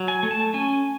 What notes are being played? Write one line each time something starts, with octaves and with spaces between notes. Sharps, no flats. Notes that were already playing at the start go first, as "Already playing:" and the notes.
Already playing: F#3
G#5
A3
A5
C#4 G#5